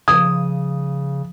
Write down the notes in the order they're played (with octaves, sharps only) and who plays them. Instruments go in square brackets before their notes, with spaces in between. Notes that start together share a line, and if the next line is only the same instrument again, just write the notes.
[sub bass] C#3 [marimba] F3 [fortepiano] D#6